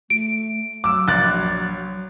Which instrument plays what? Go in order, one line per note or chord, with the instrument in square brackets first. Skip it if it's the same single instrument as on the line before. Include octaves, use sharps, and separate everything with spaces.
[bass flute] A3 [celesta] D7
[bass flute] F#3 [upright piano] D6 E6
[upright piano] A#1 F#6 A6